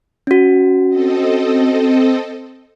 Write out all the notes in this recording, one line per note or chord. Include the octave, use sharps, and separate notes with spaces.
C#4 F#4
C4 A4 D#5